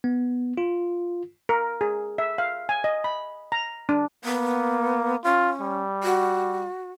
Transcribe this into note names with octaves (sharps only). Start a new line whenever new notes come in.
B3
F4
A#4
G#4
E5
F5
G#5
D#5
B5
A#5
D4
A#3 B3
C#4 F4
G3
F#4